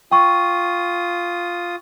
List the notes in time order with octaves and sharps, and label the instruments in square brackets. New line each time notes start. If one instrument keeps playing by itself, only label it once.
[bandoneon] F4 D#6 [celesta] G5 C#6